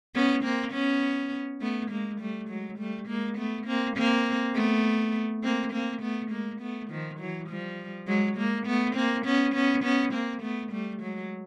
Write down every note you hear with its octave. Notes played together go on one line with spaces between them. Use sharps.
B3 C#4
A#3 C4
B3 C#4
A3 B3
G#3 A#3
G3 A3
F#3 G#3
G3 A3
G#3 A#3
A3 B3
A#3 C4
A#3 C4
A3 B3
A#3 C4
A#3 C4
A3 B3
G#3 A#3
A3 B3
D#3 F3
E3 F#3
F3 G3
F#3 G#3
G#3 A#3
A3 B3
A#3 C4
B3 C#4
B3 C#4
B3 C#4
A#3 C4
A3 B3
G3 A3
F#3 G#3